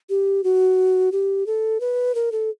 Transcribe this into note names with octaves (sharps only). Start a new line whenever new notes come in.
G4
F#4
G4
A4
B4
A#4
A4